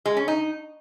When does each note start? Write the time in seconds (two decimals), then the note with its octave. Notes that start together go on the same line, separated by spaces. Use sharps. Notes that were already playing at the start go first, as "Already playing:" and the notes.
0.06 G#3
0.17 C#4
0.28 D#4